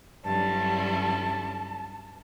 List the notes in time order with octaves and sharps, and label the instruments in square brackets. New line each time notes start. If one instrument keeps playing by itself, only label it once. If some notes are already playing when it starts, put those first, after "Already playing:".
[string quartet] G2 D3 F#3 C#4 E4 [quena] A5